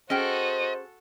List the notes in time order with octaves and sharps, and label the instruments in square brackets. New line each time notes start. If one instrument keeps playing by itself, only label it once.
[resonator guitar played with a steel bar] C#4 G#4 G5 [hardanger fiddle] F#4 A4 [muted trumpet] C5 [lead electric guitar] D#5